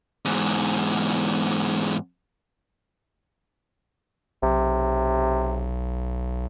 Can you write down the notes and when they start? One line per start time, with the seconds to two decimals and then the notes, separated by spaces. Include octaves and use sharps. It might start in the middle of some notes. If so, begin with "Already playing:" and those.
0.25 E2 G#2
4.43 B1 C3